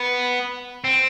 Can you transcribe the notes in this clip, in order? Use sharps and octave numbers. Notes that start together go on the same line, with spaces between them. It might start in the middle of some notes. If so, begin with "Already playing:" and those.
Already playing: B3
C4